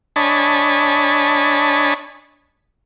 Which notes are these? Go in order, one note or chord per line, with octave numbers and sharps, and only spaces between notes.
D4 C#5 D#5 G#5 A5 B5